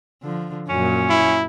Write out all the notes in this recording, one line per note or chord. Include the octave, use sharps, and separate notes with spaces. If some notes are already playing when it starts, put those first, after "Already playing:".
D3 F3
F#2 A#2 C#4
E4